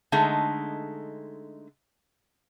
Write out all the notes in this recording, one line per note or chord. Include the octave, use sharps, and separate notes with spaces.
D3 G#3 A3 D#4